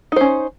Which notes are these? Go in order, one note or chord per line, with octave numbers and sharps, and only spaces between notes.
C#4 D#4 C5